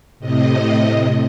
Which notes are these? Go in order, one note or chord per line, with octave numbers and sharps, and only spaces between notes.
A2 C3 D#5